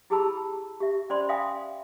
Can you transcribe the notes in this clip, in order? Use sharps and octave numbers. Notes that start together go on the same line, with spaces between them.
E4 G4 G#4 A5 B5 E6
G4 E5
C#4 C5 D5 B5 C6
E5 F5 G5 G#5 D#6